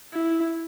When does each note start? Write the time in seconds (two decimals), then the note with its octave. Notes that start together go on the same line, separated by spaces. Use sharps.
0.13 E4